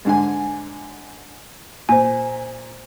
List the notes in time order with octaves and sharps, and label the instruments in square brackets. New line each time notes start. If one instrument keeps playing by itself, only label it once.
[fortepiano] G#2 D3 G#5
[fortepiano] A#2 [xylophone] C5 G#5